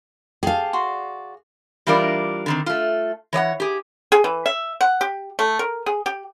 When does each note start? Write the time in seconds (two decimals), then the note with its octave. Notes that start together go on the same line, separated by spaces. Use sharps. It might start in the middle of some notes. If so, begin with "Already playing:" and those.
0.43 G4 G#4 F5 A5
0.73 F#4 D5 C6
1.87 E3 G3 D4 F4 A#4 D5
2.46 D3 D#3 C4
2.66 A3 F4
3.33 E3 C#5 D#5 F#5
3.60 G4 G#4
4.12 G#4
4.24 E3
4.46 E5
4.81 F#5
5.01 G4
5.39 A3
5.59 A#4
5.86 G#4
6.06 G4